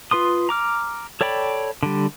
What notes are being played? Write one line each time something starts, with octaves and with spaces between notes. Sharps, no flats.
F4 B4 C6 D#6
A#5 D6 F6
A4 C#5 D5 G5 B5
D3 G3